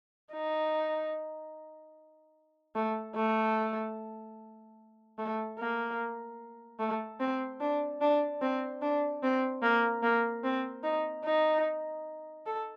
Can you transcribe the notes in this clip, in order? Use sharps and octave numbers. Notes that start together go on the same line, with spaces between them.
D#4
A3
A3
A3
A#3
A3
C4
D4
D4
C4
D4
C4
A#3
A#3
C4
D#4
D#4
A4